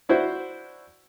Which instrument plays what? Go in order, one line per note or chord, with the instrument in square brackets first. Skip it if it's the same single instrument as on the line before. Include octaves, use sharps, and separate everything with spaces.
[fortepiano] D4 E4 F#4 C5